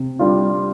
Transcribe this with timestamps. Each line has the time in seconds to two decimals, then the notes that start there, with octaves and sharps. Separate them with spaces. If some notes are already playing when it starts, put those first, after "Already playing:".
Already playing: C3
0.19 G3 D4 F4